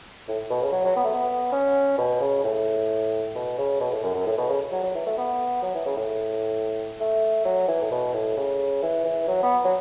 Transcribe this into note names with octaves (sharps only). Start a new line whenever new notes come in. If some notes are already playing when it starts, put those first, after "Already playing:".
A2
B2
C#3
F#3
F#3
B3
A3
B3
C#4
B2
C#3
A2
B2
C#3
B2
A2
F#2
F#2
A2
B2
C#3
F#3
F#3
E3
A3
B3
F#3
E3
C#3
A2
A3
F#3
E3
A2
B2
A2
C#3
E3
E3
F#3
B3
F#3